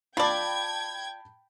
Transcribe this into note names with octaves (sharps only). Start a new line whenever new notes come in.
F4 D5 G5 A5 B5 G#6